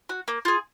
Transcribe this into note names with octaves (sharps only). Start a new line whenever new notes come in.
F#4
A#3
F4 G#4